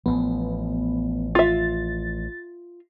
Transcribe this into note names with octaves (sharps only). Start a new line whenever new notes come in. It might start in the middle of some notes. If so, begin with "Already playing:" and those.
A1 F3 B3
F4 E5 A6